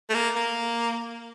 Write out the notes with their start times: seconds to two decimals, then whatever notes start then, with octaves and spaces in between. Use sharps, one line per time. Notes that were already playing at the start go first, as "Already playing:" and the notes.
0.10 A3
0.14 A#3
0.36 A#3